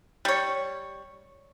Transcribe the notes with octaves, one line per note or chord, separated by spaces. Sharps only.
G3 C#5